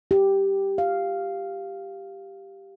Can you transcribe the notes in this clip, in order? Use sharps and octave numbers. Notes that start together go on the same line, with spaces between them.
G4
F5